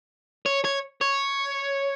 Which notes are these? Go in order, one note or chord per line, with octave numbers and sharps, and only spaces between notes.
C#5
C#5
C#5